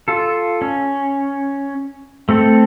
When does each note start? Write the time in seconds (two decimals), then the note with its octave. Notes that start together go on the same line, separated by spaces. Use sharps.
0.08 F4 A4
0.62 C#4
2.29 A3 C4 A4